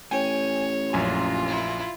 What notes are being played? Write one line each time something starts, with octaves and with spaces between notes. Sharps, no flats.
A1 C#5 G5 G#5
A#1 F#2 F4 G#5
E4